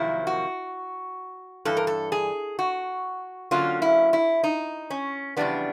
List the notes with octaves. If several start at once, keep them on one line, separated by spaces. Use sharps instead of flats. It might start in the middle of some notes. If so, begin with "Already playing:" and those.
Already playing: F2 C3 D#3 F#3 A#3 E4
F#4
G2 E3 A4
A#4
A4
G#4
F#4
D3 F#3 A#3 C#4 F4
E4
E4
D#4
C#4
F2 C#3 E3 G3 B3 D4